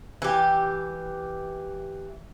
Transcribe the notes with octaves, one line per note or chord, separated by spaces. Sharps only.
E3 G4